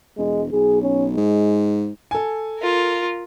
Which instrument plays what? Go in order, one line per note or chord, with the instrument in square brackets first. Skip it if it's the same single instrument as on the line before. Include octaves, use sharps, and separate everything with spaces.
[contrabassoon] E1 [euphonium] G#3
[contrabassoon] B1 [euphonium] G#4
[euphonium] C#4
[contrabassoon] G#2 [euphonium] G#3
[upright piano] A4 G#5
[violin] F4 A#4